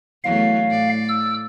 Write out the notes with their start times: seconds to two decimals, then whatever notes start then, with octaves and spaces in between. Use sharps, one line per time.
0.24 E2 F#3 A3 F5
0.68 A2 D5
1.09 E6